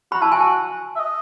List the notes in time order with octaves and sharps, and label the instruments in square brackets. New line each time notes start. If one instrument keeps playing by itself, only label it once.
[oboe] F#4 [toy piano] B5
[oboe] E4 [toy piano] A5
[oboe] F#4 [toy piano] G#5
[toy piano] A5
[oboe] E5
D#5